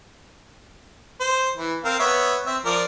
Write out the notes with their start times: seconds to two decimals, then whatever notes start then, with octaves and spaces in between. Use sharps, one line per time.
1.21 C5
1.57 E3
1.85 C4 A#4 F5
1.99 B3 C#5 E5
2.46 C4 E5
2.65 F3 A#4 D5